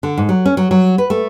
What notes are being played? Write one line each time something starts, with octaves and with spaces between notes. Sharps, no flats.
D3
G#2
F#3
C#4
F#3
F#3
B4
A3